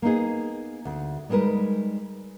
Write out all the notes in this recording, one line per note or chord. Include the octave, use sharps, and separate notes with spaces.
A#3 B3 D#4 G#4
D2
G3 G#3 B3 D#4 A#4 B4